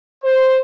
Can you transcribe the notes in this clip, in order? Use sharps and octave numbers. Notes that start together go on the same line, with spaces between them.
C5